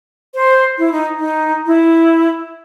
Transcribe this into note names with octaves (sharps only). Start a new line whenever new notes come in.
C5
E4
D#4
D#4
E4